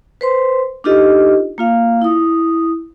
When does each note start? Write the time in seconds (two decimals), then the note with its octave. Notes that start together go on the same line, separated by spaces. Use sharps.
0.21 B4 C5 C6
0.84 D4 D#4 F4 G4 A4 D#5
1.58 A#3 F4 F5
2.02 E4 D#6